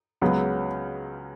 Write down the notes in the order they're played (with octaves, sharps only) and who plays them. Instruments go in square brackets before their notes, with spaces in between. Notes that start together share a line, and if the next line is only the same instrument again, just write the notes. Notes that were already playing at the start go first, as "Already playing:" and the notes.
[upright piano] C#2 C#3 F#3 B3